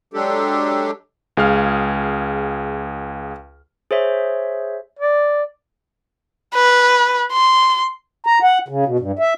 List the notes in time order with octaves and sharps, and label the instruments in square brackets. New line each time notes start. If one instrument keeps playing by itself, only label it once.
[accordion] F#3 G#3 D4 G4 A4
[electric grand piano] C#2 G#4 F5 F6
[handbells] G#4 C5 C#5 E5
[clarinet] D5
[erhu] B4
C6
[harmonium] A#5
F#5
C#3
B2
G2
E5